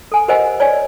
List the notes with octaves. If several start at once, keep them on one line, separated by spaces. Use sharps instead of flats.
A4 G#5
G4 A#4 C5 D#5 F#5 G#5
C#5 D5 G#5